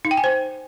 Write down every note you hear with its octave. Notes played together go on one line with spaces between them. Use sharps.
D#4
G5
G#5
C5